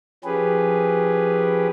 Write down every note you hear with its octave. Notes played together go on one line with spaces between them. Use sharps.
F3 C#4 G4 G#4 B4